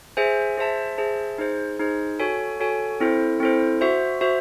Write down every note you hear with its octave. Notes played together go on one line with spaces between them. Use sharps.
G#4 C5 E5 G#5
G#4 C5 E5 A5
G#4 C5 E5 A5
D#4 G#4 C5
D#4 G#4 C5
F#4 A4 C#5 G#5
F#4 A4 C#5 G#5
C4 E4 A4 C5
C4 E4 A4 C5
F#4 C5 E5
F#4 C5 E5